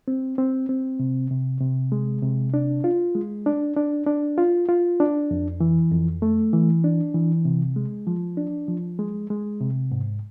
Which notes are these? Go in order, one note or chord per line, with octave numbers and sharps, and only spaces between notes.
C4
C4
C4
C3
C3
C3
G#3
C3
D4
F4
G#3
D4
D4
D4
F4
F4
D4
F2
E3
F2
A3
E3
D4
E3
C3
G#3
F3
D4
F3
G#3
G#3
C3
G#2